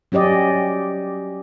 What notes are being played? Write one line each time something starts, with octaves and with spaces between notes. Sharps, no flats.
F#3 C#4 G4 D5 D#5